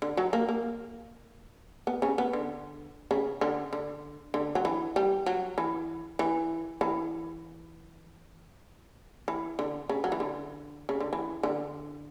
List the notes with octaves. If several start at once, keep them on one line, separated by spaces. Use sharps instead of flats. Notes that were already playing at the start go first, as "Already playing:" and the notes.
D3
F#3
A#3
A#3
B3
C#3 C#4
B3
D3
C#3
D3
D3
D3
F#3
E3
G3
F#3
E3
E3
E3
E3
D3
C#3
F#3
E3
D3
C#3
D3
E3
D3